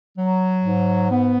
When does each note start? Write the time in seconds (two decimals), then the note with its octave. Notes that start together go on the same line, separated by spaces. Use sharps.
0.17 F#3
0.64 G#2
1.10 B3